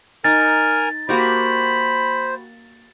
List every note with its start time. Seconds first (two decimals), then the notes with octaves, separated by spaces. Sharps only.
0.24 D#4 A#4 G#5 F6 A6
1.09 A#3 F#4 G4 C5 B5